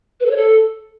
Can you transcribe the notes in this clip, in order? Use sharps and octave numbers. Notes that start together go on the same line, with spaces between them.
B4
A4
C#5
A4